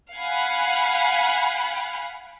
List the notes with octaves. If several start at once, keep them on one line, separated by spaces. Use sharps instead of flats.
F5 F#5 G#5 B5